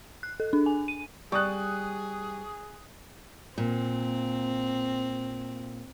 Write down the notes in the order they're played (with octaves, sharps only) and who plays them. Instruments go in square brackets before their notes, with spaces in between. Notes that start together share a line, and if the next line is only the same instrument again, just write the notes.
[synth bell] F#6
A4
D4
G#5
D#7
[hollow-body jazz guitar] G3 [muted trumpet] G#4 [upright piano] C#6 D#6 F#6
[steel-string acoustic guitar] A#2 [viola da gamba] C4